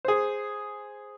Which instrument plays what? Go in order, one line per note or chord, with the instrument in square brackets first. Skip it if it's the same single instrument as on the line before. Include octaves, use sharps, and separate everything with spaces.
[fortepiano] G#4 C5